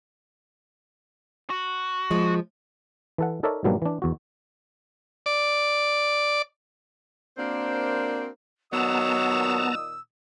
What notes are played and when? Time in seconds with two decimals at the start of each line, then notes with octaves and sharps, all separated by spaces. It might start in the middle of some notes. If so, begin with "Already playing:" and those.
1.50 F#4
2.11 F3 G#3
3.18 E3 A4 F#5
3.43 D#4 A4 A#4 C#5 D5 E5
3.64 G#2 B2 F#3 G3 A#3 D4
3.82 E3 D4
4.02 E2 F#4
5.26 D5
7.37 A#3 C4 D4 F#4 A#4 C5
8.73 A#2 D#3 F#3 B3 A5 A#5 D#6 E6